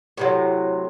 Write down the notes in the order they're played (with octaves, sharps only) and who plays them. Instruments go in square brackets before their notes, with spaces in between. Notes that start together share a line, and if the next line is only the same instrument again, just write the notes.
[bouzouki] A2 C3 F#3